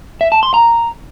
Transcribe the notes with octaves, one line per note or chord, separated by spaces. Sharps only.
E5
A5
C6
A#5